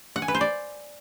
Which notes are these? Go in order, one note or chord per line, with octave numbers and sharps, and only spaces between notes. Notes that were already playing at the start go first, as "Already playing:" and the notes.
F#5
G#5
B4
C5
D5